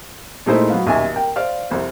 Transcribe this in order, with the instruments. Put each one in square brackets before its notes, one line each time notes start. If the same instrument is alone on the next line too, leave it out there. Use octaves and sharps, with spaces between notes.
[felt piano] A#2 G#3 A3 D#4 E4 C5
F#3 B3 F5
D#1 B1 E5 G#5
A#4 G5
C5 D5 F5 F6
C2 F2 C5